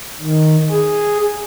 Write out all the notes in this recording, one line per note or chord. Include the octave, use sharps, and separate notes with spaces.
D#3
G#4